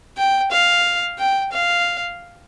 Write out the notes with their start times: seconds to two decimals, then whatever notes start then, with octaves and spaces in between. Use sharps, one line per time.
0.17 G5
0.51 F5
1.19 G5
1.52 F5